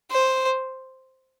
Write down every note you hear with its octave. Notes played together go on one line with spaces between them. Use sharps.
C5